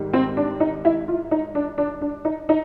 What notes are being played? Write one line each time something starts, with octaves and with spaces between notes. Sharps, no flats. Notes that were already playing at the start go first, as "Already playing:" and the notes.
Already playing: G#2 D#3 G3
C4
D4
D#4
E4
F4
D#4
D4
D4
D4
D#4
D#4